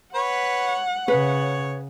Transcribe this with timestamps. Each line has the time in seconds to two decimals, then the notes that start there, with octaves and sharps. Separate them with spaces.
0.15 B4 C#5 F#5
1.08 C#3 B4 C#5